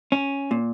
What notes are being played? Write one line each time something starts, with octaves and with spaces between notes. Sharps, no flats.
C#4
A#2